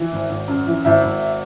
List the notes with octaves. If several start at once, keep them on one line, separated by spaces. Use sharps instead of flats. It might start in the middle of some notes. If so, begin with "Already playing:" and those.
Already playing: E3
G#1
G#1
F#2
E3
G#1 E4
G#1